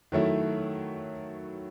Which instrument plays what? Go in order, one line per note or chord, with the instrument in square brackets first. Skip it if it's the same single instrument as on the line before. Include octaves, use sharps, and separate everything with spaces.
[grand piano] D#3 F#3 A3 E4